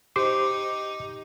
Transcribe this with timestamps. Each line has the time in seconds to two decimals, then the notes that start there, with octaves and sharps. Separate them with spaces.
0.16 D#4 G4 C5 D6